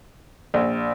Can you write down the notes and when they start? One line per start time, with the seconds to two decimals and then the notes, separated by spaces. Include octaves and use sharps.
0.54 A#1